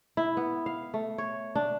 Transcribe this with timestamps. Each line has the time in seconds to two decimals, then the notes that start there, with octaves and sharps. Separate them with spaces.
0.17 E4
0.37 B3
0.66 F5
0.94 A3
1.18 C#5
1.55 D4